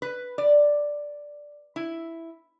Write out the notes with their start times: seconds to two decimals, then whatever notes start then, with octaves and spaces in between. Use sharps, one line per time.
0.02 B4
0.38 D5
1.76 E4